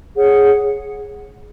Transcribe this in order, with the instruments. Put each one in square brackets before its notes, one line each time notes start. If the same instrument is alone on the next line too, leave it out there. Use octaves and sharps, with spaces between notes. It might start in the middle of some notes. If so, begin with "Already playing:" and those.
[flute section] G#4 C#5 F#5